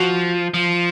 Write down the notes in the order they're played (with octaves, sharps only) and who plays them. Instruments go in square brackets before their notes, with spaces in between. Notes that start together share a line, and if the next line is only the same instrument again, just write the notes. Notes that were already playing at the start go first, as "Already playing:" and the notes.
Already playing: [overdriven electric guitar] F3 [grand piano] F#4
[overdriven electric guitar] F3